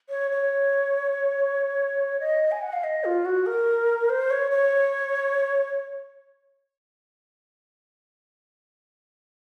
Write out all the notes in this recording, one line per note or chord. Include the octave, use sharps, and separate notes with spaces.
C#5
C#5
D#5
G#5
F#5
F5
D#5
F4
F#4
A#4
C5
C#5
C#5